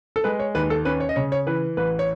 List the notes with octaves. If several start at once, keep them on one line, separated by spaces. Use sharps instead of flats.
A4
G#3 B4
C#5
D#2 B4
A4
C#4 B4
C#5
D#5
C#3 C#5
C#5
E3 B4
A1 B4
C#5